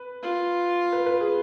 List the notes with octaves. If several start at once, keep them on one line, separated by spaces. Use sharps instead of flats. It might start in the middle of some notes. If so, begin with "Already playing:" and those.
Already playing: B4
F4
B4
B4
G#4